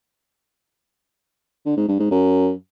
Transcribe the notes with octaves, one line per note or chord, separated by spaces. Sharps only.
D3
G#2
G2
G#2
F#2